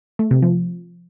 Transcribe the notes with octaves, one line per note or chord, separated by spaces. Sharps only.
A3
C3
F3